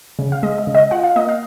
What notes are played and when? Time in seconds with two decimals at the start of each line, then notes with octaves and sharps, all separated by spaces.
0.19 C#3
0.32 F5
0.43 G#3 D#5
0.58 D#5
0.67 C#3
0.75 D#5
0.91 F4 F#5
1.03 F5
1.16 A#3 D#5
1.29 F5